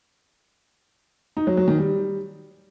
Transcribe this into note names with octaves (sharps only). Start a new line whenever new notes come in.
D#4
F#3
F#3
D#3
G3